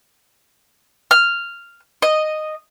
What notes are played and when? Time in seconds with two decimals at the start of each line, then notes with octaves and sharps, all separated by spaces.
1.11 F6
2.02 D#5